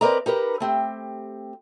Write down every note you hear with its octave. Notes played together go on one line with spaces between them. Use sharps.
C4 A#4 B4 D5 D#5 A#5
D#4 G4 A#4 B4
A3 C4 G4